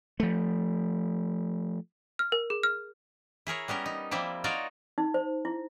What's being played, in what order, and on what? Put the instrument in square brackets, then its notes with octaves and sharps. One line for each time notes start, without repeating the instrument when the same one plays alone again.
[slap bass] F3 A3
[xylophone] F6
A#4
G#4
F6
[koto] E4 G#4 A#4 C#5
G3 B3 C#4 A#4
D#4
F3 G3 A#3 C4 E4
D#4 F4 F#4 A#4 C#5 D5
[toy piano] D#4
C5
E4